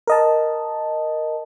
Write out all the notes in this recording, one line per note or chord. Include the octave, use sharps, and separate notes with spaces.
A#4 D#5 A5